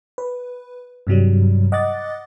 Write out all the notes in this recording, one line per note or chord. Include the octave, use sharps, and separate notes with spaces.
B4
G2 C3 F#3 G3
D#5 F#5 D6 F#6 A6